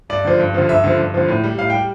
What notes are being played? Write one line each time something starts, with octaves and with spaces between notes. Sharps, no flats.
G2 D5
D3 F3
G2
D3 F3
G2 E5
D3 F3
G2
D3 F3
A2
G3
A2 F5
G3 G5